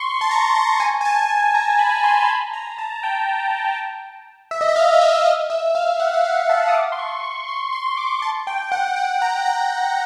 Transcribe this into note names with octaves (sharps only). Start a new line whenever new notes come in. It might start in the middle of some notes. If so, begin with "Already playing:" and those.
Already playing: C6 C#6
A5
A#5
A5
G#5
G#5
A5
A5
A#5
B5
C6
B5
A#5
A5
G5
E5
D#5
E5
F5
D#5
E5
D#5
E5
F5
F#5
F#5
F5
A5
D#6
D6
C6
C#6
C#6
C6
C6
D6
A5
G5
F#5
G5
A#5
A#5